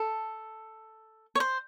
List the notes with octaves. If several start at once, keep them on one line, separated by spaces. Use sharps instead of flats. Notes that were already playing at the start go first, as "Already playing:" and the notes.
Already playing: A4
C#5
C5